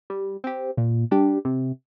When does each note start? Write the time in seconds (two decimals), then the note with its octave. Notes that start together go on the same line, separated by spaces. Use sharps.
0.10 G3
0.44 C4 G4
0.77 A#2
1.11 G3 D4 G4
1.45 C3